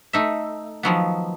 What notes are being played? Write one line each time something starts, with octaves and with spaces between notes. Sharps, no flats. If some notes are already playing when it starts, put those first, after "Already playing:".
A3 D#4 E5
D#3 F3 F#3 B3